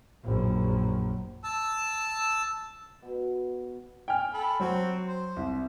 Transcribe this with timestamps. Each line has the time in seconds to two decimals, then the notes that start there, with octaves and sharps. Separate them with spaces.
0.24 A#1 F#2
1.44 A5 E6
3.02 B2
4.08 G5 G#5 F6
4.34 A4 B5
4.60 F#3 C4 F#4
5.06 C5
5.36 C2